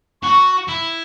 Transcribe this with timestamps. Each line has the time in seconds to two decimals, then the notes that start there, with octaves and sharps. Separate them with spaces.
0.23 F#4 C#6
0.68 E4